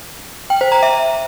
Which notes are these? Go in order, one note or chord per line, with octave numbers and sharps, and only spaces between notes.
G5
C5
A#5
E5